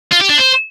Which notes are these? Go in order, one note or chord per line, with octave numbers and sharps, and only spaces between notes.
F4
G4
D4
C5